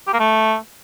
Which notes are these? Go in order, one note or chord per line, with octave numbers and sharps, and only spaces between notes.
G4
A#3
A3